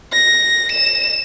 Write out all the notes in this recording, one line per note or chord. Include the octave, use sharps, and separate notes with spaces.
A#6
E7